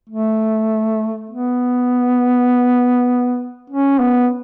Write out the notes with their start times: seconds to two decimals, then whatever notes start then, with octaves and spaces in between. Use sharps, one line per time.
0.09 A3
1.29 B3
3.70 C#4
4.00 B3